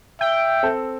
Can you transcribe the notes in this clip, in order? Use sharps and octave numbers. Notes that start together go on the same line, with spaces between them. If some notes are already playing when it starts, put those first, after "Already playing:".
E5 G5
C4 A4